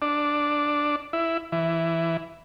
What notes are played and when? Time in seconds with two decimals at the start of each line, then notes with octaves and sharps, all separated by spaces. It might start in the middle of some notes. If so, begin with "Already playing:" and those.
0.02 D4
1.13 E4
1.52 E3